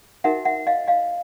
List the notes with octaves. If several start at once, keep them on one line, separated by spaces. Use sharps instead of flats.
D#4 F#4 A#4 E5 F#5
E5 F#5
D#5 F5
D#5 F5